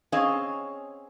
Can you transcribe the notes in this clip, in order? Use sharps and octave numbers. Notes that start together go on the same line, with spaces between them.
C4 C#4 G#4 C#5 D#5 F5